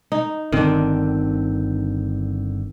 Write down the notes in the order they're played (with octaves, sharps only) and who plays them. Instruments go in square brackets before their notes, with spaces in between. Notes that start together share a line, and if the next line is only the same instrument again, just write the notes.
[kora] D#4
[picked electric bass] G1 D3 C4 [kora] D#3 D4